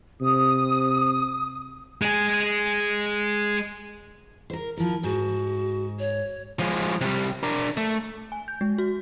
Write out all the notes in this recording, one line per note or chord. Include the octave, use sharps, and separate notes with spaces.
C3 D#6
G#3 G#4
A#4 C5
F3 E4 A#4
G#2 F#4
C#5
F3 G#3
C3 G3
D4 A#4
A3
G#5
G6
G#3
F#4